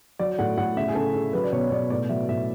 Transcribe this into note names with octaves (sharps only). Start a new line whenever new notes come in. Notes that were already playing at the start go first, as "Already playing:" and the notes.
F#3 D5
A2 F#5
A2 F#5
C#3 E5
G#4
C#3 A4
C#3
F#3 B4
D5
B2 C#5
B2 D5
A2 D5
F#3 E5
A2 E5